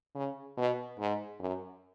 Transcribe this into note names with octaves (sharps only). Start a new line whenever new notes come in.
C#3
B2
G#2
F#2